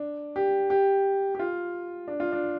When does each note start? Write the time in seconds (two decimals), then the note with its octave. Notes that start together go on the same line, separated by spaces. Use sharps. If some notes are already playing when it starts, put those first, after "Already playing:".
Already playing: D4
0.36 G4
0.70 G4
1.35 G4
1.39 F4
2.08 D4
2.20 F4
2.32 D4